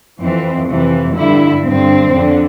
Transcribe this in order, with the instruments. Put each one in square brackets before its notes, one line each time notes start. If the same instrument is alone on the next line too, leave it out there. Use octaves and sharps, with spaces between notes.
[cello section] F2 E3 C4
F2 C3 E3
G2 D3 E4
G2 D3 C4
F2 D3